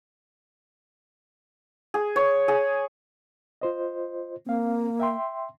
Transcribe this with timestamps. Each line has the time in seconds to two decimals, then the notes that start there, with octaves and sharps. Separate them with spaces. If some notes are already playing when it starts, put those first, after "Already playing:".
1.94 G#4
2.16 C#5
2.48 G#4
3.61 F4 C5 D#5
4.46 A#3 C4 F5
5.00 E5 G5 C6